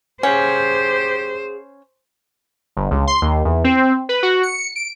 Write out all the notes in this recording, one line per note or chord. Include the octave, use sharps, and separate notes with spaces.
C#4 G4 G#4 C5 F5 F#5
G1
C#2
C6
D#2
E2
C4
B4
F#4
C#7
D7